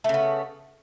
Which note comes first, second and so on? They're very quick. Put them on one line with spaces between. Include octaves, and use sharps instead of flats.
A3 C#3 B3